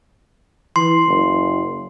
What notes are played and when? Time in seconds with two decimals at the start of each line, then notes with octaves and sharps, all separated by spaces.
0.76 E3 C6
1.06 F#1